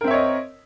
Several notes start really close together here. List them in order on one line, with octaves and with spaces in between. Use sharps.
A#4 C4 E5 C#5 D#5